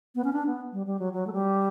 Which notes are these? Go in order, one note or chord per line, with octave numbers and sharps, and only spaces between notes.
B3
C#4
D4
B3
G3
G3
F#3
F#3
A3
G3